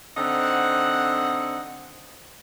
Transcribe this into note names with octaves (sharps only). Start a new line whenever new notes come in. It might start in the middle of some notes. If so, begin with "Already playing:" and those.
D3 C4 D#4 F#5